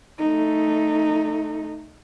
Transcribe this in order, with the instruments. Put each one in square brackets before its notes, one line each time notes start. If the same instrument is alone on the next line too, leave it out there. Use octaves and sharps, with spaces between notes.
[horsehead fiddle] A3 D#4